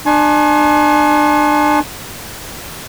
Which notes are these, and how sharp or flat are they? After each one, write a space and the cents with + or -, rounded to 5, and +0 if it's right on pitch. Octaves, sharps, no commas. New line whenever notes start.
D4 +30 G#5 +30 C6 +45